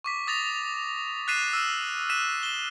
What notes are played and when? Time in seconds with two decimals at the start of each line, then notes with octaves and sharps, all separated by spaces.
0.04 C#6 D6 B6
0.27 D#6 A6 A#6 F7
1.28 F#6 A6 B6 C7 D#7 E7
1.53 E6 F6 E7
2.10 F#6 B6 D#7 E7
2.43 E7 G7